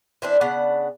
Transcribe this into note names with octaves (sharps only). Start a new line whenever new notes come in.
E3 C4 D4
C#3 B3 D4 F#5